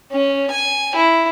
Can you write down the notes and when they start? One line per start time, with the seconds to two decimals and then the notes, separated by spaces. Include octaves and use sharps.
0.12 C#4
0.51 G#5
0.95 E4